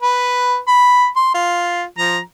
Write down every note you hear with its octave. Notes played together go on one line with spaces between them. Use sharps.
B4
B5
C6
F4
F3 A#5